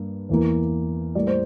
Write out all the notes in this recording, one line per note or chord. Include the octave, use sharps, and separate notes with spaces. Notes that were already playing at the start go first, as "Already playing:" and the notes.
Already playing: G2 A#3
E2 E3 A#3
A2 G3 A#3 D5
C5